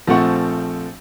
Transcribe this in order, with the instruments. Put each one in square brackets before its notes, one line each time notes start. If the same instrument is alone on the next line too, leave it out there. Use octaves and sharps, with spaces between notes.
[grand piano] A#1 F3 A3 C4 F#5 C#6